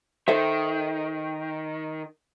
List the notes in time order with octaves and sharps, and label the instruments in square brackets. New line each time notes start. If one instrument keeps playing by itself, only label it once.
[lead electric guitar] D#3 [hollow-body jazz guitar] A4 C5 E5